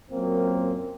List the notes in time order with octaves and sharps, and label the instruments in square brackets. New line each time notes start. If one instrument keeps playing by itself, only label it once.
[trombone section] F#2 A#2 F#3 A#3 C4